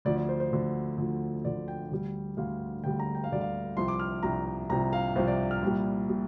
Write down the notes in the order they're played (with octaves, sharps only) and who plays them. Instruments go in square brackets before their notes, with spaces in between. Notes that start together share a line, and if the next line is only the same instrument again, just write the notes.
[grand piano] D2 D3 F3 D5
D5
C5
C5
D2 D3 F3
D2 D3 F3
D2 D3 F3 D5
G5
D2 D3 G3
D2 D3 G3 F5
D2 D3 G3 G5
A#5
G5
F5
D2 D3 G3 D5
F5
C2 C3 F3 C6
D6
F6
C2 C3 F3 A#5
C2 C3 F3 A#5
F5
C2 C3 F3 C5
D5
F6
C2 A#2 G3
A#2 G3